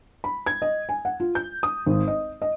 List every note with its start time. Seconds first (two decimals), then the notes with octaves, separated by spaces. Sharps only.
0.24 B5
0.46 G#6
0.62 D#5
0.89 G#5
1.05 F#5
1.20 F4
1.35 G6
1.63 D#6
1.86 G#1
2.08 D#5
2.42 D#5